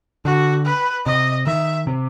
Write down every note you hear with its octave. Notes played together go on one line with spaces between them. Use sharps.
D3 F#4
B4
C3 D#5
D#3 E5
C3